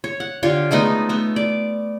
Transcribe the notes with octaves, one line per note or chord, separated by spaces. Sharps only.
C#5
F#5
D3 F4 G4 C#5
G#3 A3 B3 D#4
A3 B3
D5